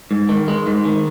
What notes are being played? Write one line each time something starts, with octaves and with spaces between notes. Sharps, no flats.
G#2
D#3
G#3
G#2
D#3